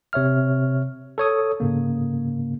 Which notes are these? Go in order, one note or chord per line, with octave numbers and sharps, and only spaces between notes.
C3 C#5 E5 F6
A4 C#5 D#6
G#2 C#3 A#3